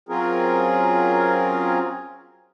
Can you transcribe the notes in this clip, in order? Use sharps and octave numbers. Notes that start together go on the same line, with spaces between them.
F#3 C4 C#4 F4 G#4 A#4